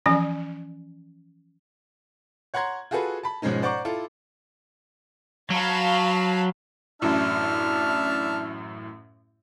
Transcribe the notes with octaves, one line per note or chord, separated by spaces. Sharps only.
E3 F3 C#4 G#5
C#5 F#5 A#5 C6 G#6
F4 F#4 G#4 A4 B4
A5 B5
G#2 B2 F3 G#3 C#4 D#4
C5 D5 F#5 A#5 C#6 D6
E4 F4 A4
F#3 F5 A5 B5
A1 F#2 A2 D4 E5 A5 F6